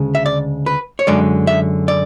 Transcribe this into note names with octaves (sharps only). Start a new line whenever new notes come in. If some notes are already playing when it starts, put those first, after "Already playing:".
Already playing: D2 C#3 G#3
E5
D5
B4
C#5
F#2 D3 G#3 D5
E5
D5